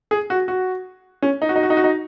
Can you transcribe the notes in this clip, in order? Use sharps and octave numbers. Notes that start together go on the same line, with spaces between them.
G#4
F#4
F#4
C#4
D#4
F#4
D#4
F#4
D#4
F#4
D#4